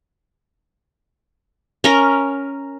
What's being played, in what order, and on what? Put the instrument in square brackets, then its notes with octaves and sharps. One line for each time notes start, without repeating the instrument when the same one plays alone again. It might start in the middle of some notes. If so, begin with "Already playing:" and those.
[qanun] C#4 A#4